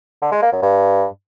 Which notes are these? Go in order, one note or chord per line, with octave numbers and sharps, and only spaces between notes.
D3
G#3
A#3
F#2
G2